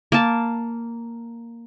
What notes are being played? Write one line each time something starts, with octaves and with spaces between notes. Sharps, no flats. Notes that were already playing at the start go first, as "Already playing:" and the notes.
A#3 A5